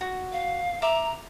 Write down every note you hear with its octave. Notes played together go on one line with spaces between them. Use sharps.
F#4
F5
E5 A#5 D6